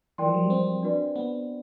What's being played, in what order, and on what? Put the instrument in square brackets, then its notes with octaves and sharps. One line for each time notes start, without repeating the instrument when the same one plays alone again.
[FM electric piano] E3 [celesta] A#4 D5 G5 C6
[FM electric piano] F3
F#3
G3
C4
[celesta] D4 F#4 B4 D5
[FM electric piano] B3